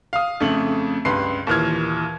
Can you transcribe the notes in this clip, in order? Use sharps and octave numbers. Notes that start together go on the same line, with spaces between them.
F5 D#6
F2 C#3 A3 F#7
C#2 G2 B4 C6 C7
D#2 A#2 E3 F6 G#6